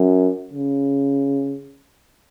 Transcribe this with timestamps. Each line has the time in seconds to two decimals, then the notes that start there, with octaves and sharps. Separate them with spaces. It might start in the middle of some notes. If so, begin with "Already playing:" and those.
Already playing: F#2
0.53 C#3